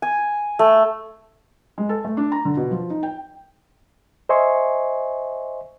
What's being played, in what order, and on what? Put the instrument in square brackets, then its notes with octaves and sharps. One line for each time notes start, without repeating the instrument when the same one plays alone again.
[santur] G#5
A3
[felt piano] G#3
A4
A3
D4
A#5
D3
B2
F3
D#4
G5
[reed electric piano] C5 D#5 E5 G#5 C6 C#6